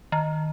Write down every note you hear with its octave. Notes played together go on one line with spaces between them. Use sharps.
D#3